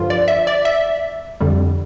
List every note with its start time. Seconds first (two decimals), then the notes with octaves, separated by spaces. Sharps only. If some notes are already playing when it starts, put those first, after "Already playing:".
Already playing: G2 D3 F3 F4
0.10 D5
0.28 E5
0.47 D5
0.65 E5
1.41 F2 D3 G3